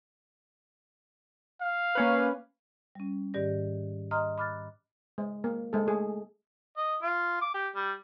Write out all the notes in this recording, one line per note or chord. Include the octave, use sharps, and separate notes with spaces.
F5
A#3 C#4 B4
G3 C#4
G#2 D#3 G4 D5 A#6
D#5 A#5 C6 D#6 F6
B5 D6 F6 F#6 A6
G#3
A#3
G#3 A4
A3 G#4
D#5
F4
D6
G4
G3